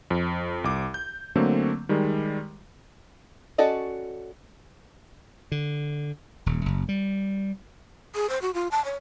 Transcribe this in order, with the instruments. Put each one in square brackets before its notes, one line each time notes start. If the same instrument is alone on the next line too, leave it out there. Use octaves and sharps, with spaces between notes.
[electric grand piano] F2
C2 D6
G6
D3 F#3 A3 A#3 C4
D#3 G3 G#3
[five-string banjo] C#4 F#4 A4 D5 D#5
[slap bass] D3
D#1
F#1
G3
[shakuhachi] G#4
C5
F#4
F4
A5
C#5